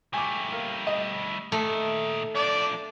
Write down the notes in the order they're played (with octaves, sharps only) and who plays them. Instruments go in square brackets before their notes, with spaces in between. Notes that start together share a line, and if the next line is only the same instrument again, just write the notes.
[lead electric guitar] G3 A3 [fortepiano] G#5 D6
[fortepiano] A#3
D#5
[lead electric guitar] A#2 D#3 [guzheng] A3
[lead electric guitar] F3 D4 [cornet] D5